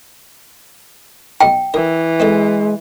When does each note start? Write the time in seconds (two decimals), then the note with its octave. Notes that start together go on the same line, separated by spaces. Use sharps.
1.41 B1 D#4 G5 B5
1.74 E3 A#4
2.20 G#3 C4 D#4 A4